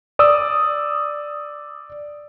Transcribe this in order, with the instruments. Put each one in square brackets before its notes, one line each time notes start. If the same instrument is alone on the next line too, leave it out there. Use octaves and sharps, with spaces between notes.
[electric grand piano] D5 D#6 E6